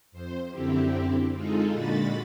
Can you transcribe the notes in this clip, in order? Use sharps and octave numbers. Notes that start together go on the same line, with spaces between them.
F2 C5
F#2 D3 C4 E4 G4
G#3 D#4 F4 G#4 A4
A#2 D3 G#3 F#4 B5 A6